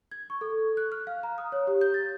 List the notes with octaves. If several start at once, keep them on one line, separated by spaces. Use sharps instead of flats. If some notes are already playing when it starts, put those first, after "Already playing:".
G#6
C#6
A4
F#6
F6
F5
A#5
D#6
C#5
G4
G6
A6